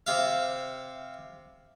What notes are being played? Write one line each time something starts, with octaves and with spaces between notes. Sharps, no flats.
C3 E5 F5